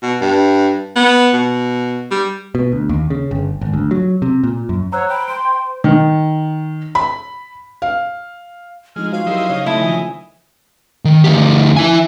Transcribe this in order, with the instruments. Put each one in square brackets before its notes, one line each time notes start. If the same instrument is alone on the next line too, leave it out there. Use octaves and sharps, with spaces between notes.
[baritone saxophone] B2
G2
B3
B2
G3
[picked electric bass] B2
D2
D#2
C#3
G1
G#1
D2
F#3
C3
A#2
F#2
[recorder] C5 [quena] C#5 [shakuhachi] F#5 [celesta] A#5 E6 F#6
[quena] G5 [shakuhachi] B5
[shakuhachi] C6 [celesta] D7
[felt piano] D#3
B5
F5
[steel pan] F3 D#4 [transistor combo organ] G#3 [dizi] F6
[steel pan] F#4 C5 [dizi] F5
[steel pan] F#3 G4 A#4 [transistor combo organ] D#4 E4 C5
[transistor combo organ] C#3 D#4 [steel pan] C#5
[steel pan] A3 [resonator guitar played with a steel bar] E4 [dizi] A5
[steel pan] D#3 F3 [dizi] G#5
[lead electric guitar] D#3
D2 G4
E4 G#5